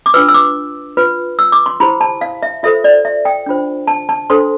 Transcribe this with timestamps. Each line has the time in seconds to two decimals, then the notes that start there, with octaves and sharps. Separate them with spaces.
0.06 D6
0.14 D4 F4 B4 E6
0.28 E6
0.34 D6
0.97 F4 B4
1.39 E6
1.52 D6
1.66 C6
1.80 E4 G4 C5 B5
2.01 A5
2.21 F5
2.43 E5
2.63 F4 A4 C5 E5
2.84 D5
3.05 E5
3.25 G5
3.46 D4 F4 C5
3.88 A5
4.09 A5
4.30 D4 A4 C5 C6